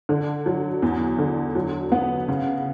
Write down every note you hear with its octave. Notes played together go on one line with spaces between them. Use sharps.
D3
F#3
E2
D3
F#3
B3
C#3